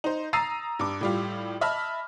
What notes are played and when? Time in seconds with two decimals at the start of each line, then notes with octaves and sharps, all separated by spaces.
0.04 D#4 C5
0.33 A#5 D#6 E6 A6 C7 D#7
0.79 G2 D6
1.01 A2 G3 F4
1.61 D#5 E5 A5 B5 F6